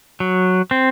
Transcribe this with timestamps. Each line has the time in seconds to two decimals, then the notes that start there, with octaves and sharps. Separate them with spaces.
0.20 F#3
0.71 C4